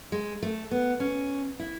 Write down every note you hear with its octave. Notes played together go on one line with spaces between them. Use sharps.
G#3
A3
B3
C#4
E4